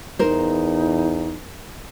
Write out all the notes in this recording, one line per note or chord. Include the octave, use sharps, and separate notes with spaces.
E2 D#4 A#4 C5